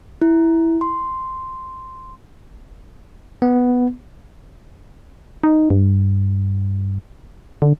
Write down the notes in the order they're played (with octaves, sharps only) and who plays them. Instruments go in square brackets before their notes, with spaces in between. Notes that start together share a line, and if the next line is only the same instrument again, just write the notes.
[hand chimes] E4
C6
[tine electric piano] B3
[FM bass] D#4
G2
D3